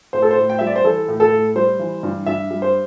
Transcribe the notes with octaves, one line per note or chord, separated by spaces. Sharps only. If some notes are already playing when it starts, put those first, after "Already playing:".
A2 C5
A4
C5
A2
G5
G3 E5
D5
C5
E3 A4
A2
A4
A2
G3 C5
E3
G2
G2 E5
G3
C5